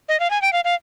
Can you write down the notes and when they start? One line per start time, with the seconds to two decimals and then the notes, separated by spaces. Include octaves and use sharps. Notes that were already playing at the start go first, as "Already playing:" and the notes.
0.09 D#5
0.20 F5
0.30 G#5
0.42 G5
0.53 F5
0.64 F5